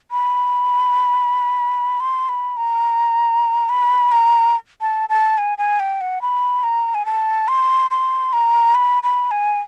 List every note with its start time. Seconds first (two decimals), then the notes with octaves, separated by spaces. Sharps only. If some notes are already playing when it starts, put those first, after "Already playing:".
0.11 B5
2.00 C6
2.29 B5
2.57 A#5
3.69 B5
4.12 A#5
4.81 A5
5.09 A5
5.38 G#5
5.58 G#5
5.80 G5
6.01 F#5
6.22 B5
6.63 A#5
6.95 G#5
7.06 A5
7.48 C6
7.91 C6
8.33 A#5
8.75 B5
9.03 B5
9.31 G#5